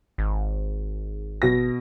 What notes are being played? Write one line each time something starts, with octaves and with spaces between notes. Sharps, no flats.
G#1
B2 A#6